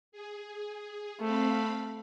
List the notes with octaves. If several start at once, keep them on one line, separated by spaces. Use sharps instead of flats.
G#4
A3 C4 F5 B5